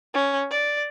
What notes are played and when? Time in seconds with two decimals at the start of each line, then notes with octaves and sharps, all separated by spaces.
0.14 C#4
0.51 D5